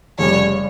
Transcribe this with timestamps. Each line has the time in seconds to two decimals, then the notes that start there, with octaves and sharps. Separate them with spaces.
0.18 F1 F2 C#3 G3 C#5